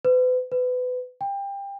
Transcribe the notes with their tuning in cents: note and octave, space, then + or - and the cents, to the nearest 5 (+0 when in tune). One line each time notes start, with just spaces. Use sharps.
B4 +40
B4 +25
G5 +25